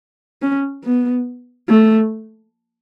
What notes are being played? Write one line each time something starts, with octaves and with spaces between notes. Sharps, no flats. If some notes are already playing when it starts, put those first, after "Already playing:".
C#4
B3
A3